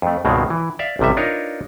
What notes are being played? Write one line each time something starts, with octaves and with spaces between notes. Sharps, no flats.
F2 A3
C#2 G2 B2 D#3 G#3 C4
E3
D5 E5 F5
A1 F2 C3 G3 E5
D4 D#4 F4 A#4 B4 C#5